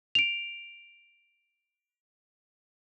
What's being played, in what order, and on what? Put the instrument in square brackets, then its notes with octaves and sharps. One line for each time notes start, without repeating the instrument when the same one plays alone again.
[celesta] D7 F7